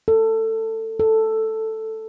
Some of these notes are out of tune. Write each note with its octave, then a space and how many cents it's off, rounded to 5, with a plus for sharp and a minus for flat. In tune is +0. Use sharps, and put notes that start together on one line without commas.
A4 +20
A4 +5